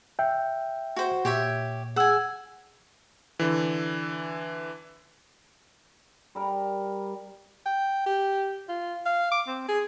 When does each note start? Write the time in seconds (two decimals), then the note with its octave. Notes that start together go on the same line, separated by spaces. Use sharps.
0.19 E5 G5
0.96 F#4 C5
1.25 A#2 G4 C#5 E5
1.96 G#4 F#5 G#5 E6
3.39 D3 E3
6.35 G3 A#4
7.66 G5
8.06 G4
8.69 F4
9.06 F5
9.31 D6
9.47 C4
9.68 G#4